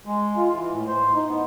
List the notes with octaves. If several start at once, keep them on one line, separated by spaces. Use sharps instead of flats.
G#3
F4
E3
A2
C5
D#4
B3